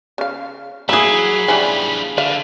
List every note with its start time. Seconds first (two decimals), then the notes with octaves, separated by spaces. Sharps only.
0.18 C#3 F5
0.89 E3 F#3 A#3 G#4 E5 B5
1.48 E3 G3 C#4 D4 F4
2.18 D3 D4 E5 F5